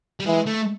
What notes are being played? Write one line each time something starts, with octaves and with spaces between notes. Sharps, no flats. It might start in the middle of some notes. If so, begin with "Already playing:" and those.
G3
E3 G#3
A3